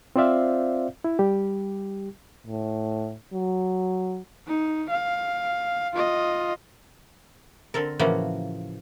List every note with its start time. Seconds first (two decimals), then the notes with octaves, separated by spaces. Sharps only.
0.16 C4 F4 C5 D5 E5 F5
1.04 E4
1.19 G3 G4
2.47 A2
3.33 F#3
4.46 D#4
4.90 F5
5.93 F4 D#5
7.74 D3 C4 A4 A#4
7.99 A2 C#3 E3 F3 A#3 F#4